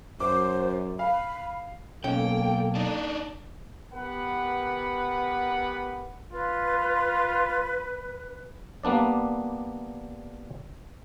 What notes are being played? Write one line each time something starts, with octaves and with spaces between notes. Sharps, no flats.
F#2 C5 D6
F5 B5
B1 A#3 C#4 A4 G5
D4 D#4
B3 G4 A#4 B4 F#5 B5
F4 B4
G3 A#3 B3 D4 D5